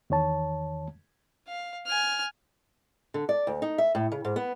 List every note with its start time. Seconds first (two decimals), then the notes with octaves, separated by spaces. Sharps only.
0.10 E2 D#3 C#5 A5
1.47 F5
1.86 G#5 F6
3.14 D3
3.29 D5
3.47 D2
3.62 D#4
3.78 E5
3.95 A2
4.12 C#3
4.25 G#2
4.36 B3